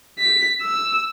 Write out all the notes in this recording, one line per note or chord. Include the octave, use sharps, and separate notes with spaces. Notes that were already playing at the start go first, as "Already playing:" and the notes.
B6
E6